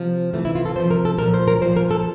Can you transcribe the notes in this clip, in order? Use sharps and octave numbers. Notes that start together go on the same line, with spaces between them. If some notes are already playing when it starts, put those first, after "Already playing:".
Already playing: C3 F3
C3 E3 A3
E4
F4
A4
C3 F3 C5
A#4
A4
A#2 F3 A#4
C5
A#4
A#2 F3 C5
A#4
A4